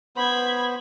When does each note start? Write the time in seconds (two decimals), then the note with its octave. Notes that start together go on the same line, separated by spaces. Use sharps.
0.16 B3 C5 B5 G#6